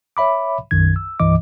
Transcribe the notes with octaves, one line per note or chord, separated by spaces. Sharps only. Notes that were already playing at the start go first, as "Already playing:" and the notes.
C#5 E5 B5 D6
B1 F#2 D#3 G#6
E6
C2 G2 E3 D#5 D6